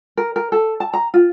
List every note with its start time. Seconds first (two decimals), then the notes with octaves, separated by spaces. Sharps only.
0.17 A#4
0.36 A#4
0.52 A4
0.80 A5
0.94 A#5
1.14 F4